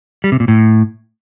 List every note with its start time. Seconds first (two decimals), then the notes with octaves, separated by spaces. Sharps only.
0.24 G3
0.32 C3
0.40 A#2
0.48 A2